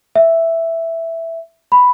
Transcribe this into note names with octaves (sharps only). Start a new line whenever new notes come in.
E5
B5